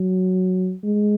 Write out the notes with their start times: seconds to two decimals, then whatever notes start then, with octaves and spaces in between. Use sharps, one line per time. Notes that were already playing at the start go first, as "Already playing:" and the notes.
Already playing: F#3
0.83 G#3